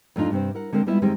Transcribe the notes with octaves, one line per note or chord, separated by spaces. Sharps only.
F2 A3 D4 D#4 F4
G2 C3 C4
E4 A#4 F#5
D3 G#3 C4 A#4
G3 G#3 B3 E4 F4 E5
F#2 D#3 G3 G#3 C4